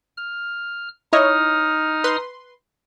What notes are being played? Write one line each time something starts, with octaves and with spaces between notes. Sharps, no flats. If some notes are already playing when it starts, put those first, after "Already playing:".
F6
D#4 E4 C#5 D#5 D#6 F6
B4 C6